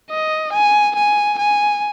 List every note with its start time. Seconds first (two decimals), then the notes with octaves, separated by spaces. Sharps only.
0.10 D#5
0.53 G#5
0.96 G#5
1.39 G#5